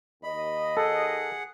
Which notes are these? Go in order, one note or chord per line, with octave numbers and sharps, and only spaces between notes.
D#2 D#5 B5
G#4 A4 F#5